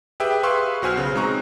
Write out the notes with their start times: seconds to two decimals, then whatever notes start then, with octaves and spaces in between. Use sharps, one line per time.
0.20 G4 G#4 B4 E5 G5
0.43 G#4 B4 F5 C6 C#6 E6
0.82 B1 F#4 C5 G#5 F6 F#6
0.97 C#3
1.15 G#3 C4 D#4 A#5 C#6 F#6